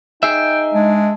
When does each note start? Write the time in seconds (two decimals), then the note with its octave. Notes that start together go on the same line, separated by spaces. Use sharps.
0.23 D#4 G#4 E5 G5
0.74 G#3 D4